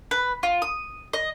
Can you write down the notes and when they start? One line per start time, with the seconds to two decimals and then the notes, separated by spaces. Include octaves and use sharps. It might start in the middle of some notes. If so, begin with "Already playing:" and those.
0.11 B4
0.43 F4
0.62 D#6
1.13 D#5